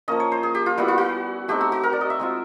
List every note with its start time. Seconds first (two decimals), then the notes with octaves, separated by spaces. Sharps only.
0.08 F3 A#3 C#4 D#5
0.20 C#5
0.32 C5
0.43 G#4
0.55 G4
0.66 F4
0.77 G3 B3 E4 F#4
0.88 F4
0.98 F#4
1.48 A3 C4 D#4 G4
1.61 F#4
1.72 F#4
1.83 A#4
1.93 D5
2.01 D#5
2.10 E5
2.19 G#3 C4 F4